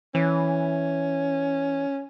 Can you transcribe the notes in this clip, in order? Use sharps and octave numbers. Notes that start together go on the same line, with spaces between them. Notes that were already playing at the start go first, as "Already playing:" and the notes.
E3 C#4